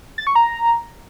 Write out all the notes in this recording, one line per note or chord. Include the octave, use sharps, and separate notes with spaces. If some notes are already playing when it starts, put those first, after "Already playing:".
A6
C#6
A#5